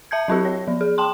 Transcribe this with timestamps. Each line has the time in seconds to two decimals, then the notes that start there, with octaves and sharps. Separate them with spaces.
0.11 E5 A5 G6 G#6
0.28 F#3 C4 E4 G4
0.45 C#5
0.68 F3
0.81 G#4
0.98 G5 A5 C6